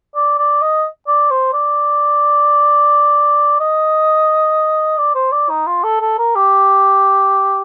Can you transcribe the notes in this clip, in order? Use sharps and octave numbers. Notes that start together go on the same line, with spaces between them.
D5
D5
D#5
D5
C5
D5
D#5
D5
C5
D5
D#4
F4
A4
A4
A#4
G4